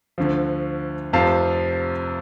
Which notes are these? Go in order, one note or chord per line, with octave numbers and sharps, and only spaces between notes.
D2 D3 F3
F1 F2 C3 F3 F5 A5